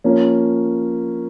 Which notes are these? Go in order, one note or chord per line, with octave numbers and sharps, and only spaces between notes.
F3 A#3 C#4